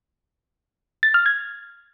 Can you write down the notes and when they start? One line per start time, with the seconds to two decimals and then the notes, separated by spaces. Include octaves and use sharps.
1.03 A6
1.14 F6
1.26 G#6